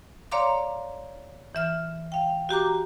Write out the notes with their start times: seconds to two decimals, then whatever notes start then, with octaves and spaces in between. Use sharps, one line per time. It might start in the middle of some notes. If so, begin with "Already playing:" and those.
0.32 C#5 D5 F5 A#5 C6 D6
1.55 E3 E5 F6
2.12 F5 G5
2.49 F#4 G4 A#5 D6